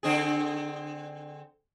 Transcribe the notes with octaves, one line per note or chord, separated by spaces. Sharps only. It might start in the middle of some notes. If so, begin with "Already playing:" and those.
D3 C4 G#4